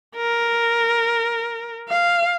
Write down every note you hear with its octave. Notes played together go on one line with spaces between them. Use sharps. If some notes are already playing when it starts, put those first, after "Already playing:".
A#4
F5